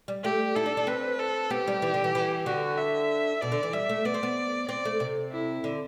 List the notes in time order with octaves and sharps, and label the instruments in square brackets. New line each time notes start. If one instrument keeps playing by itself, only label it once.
[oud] G3
[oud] A3 [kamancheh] G4
[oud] E4 [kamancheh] A4
[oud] D4
D4
[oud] C4 [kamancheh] B4
[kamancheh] A4
[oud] B3 [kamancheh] G4
[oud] G3
E3
D3
E3
E3
[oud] D3 [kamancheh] F#4
[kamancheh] E5
[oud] B2 [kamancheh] D5
[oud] D3
E3
[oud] G3 [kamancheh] E5
[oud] A3
[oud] B3 [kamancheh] D5
[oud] C4
B3
[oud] C4 [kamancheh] D5
[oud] A3
C3
[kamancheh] E4
[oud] D3